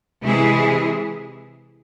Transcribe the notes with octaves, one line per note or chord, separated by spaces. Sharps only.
C3 E3 G#3 E4 G#4